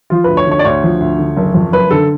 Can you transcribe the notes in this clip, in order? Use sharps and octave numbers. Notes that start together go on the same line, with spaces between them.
F3 F4
D2 B4
C#5
D3
C#5
D5
D2 C#5
F3
D2
D3
F#1
F2
F#1 B4
D3 A4